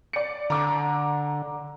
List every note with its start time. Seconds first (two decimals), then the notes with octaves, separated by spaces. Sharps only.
0.13 D5 C#7
0.50 D3 A#5 D6